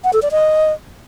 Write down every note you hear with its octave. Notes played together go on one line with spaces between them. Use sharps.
F#5
A4
D5
D#5